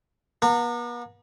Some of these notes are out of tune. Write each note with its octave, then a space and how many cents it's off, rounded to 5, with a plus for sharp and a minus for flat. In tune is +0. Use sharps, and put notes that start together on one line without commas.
B3 -45 A#5 -25